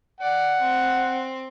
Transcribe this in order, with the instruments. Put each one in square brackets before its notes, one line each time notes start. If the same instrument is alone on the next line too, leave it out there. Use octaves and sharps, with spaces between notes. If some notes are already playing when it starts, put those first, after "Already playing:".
[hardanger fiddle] D5 [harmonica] F#5
[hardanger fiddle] C4